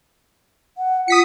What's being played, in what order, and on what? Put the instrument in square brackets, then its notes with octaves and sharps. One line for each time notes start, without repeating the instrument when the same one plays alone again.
[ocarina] F#5
[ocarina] F4 [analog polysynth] D#6 B6 C#7